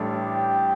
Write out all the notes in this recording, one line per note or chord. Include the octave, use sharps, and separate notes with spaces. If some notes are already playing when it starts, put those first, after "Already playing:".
Already playing: A1 A2 G3 D4 A4
G4